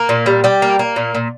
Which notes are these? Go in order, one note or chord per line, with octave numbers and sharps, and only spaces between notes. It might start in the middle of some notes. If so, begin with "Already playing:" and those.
Already playing: A#3
A#2
G3
G3 G4
A#3
A#3
A#2
A#2